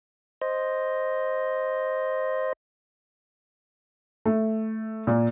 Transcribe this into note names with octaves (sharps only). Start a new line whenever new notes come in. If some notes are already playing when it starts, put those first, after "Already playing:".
C5 D#5
A3
A#2